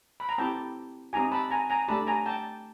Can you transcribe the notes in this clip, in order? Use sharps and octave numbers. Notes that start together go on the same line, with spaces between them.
B5
A#5
C4 E4 G4 G5 A5
C4 D#4 G4 G#5 A#5
A5 B5
G#5 A#5
G#5 A#5
A3 D4 G4 A5 B5
G#5 A#5
G5 A5